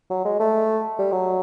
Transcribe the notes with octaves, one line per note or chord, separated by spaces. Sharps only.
F#3
G#3
A3
G3
F#3